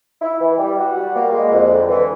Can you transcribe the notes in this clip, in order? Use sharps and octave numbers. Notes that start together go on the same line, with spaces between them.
E4
E3
G3
F#4
G3
A#3
G#3
F2
D3
E3